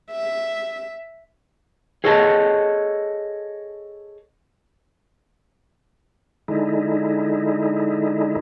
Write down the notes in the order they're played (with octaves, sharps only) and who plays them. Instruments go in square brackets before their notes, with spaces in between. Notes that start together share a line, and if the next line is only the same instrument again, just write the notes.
[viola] E5
[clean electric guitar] G#4 A4 C#5 D#5 E5 A5
[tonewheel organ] D3 G#3 D#4 E4